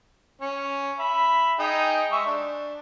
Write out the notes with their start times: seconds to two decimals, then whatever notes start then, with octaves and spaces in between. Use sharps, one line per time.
0.41 C#4 C#5
0.99 E5 B5
1.59 D#4 G#4 G5
2.12 G#3 E5 C#6
2.26 D4